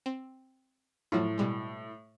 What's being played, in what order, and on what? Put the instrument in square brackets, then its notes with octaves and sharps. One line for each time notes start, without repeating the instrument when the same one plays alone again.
[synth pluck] C4
[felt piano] A2 [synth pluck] F3 F#3 F4
[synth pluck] B2 G3 G#3